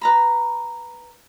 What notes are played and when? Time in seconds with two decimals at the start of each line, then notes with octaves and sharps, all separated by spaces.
0.01 B4 A#5 B5